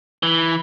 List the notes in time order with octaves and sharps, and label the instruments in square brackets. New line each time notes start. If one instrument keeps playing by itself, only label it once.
[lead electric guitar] E3